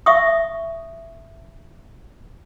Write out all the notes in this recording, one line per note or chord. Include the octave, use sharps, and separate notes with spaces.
E5 C#6 D#6